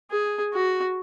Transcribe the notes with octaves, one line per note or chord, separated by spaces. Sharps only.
G#4
F#4